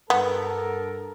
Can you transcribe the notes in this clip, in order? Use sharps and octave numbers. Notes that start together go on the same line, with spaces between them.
G2 B3 A4 A#4